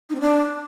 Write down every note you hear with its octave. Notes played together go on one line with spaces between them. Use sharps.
D#4
C4
D4